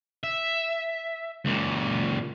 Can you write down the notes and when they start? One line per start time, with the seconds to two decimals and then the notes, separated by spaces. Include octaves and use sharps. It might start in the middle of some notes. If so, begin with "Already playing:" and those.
0.23 E5
1.45 C#2 A#2